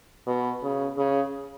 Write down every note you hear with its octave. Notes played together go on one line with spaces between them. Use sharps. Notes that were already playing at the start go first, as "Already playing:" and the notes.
B2
C#3
C#3